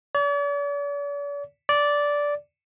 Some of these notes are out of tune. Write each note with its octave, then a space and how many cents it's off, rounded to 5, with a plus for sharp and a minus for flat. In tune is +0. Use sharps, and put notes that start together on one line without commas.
D5 -45
D5 -10